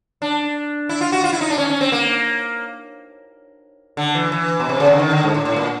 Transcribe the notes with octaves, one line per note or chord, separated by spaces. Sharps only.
D4
E4
F4
F#4
F4
E4
D#4
D4
C#4
C#4
C4
A#3
D3
E3
E3
B2
C3
C#3
D3
D#3
D3
G#2
A2
A2
A#2